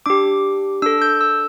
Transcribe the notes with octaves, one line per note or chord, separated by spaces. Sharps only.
D4 G4 D6
D4 A4 E6
G6
E6